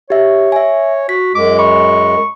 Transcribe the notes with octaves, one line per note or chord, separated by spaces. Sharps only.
G4 C#5 E5
E5 G#5
F#4 B6
F#2 G#3 D6
B5 C#6